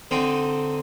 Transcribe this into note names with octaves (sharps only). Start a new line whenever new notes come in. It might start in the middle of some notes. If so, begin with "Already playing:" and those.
D3 C4 D#4